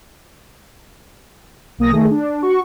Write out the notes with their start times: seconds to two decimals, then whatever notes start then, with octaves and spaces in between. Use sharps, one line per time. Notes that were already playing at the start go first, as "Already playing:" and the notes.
1.78 B1 A#3 D#6 A#6
1.92 D#3 A3 G#4
2.11 D4
2.42 F#4 C#6